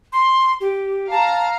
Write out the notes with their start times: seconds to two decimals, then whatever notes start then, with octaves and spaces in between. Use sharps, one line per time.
0.12 C6
0.61 G4
1.11 F5 A5 A#5